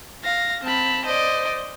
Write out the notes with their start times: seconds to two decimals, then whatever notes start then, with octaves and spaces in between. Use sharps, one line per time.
0.24 F5 A#6
0.64 C4 A5 B5
1.05 C5 D5 D#5